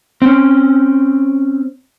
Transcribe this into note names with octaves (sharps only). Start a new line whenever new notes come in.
C4 C#4